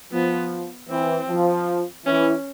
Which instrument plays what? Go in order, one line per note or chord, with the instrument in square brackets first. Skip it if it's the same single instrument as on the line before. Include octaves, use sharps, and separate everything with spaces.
[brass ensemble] F3 [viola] B3
[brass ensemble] E3 [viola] C4
[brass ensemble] F3
[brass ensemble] E3 [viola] C#4